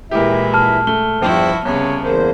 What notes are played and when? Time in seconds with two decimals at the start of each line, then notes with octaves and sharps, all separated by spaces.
0.11 A#2 E3 G#3 E4 G4 A#4 E5
0.54 A5 F6
0.87 A3 G7
1.22 E2 G2 F3 E4 F#4 C5 G5
1.65 C2 C#3 B3 C#5
2.03 E2 A#3 C5